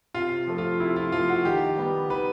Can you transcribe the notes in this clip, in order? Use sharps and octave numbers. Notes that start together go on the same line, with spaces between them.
C3 F4
F3 A3
F4
C3 E4
F4
F3 A3 F4
F#4
D#3 G4
G3 B3
D#3 B4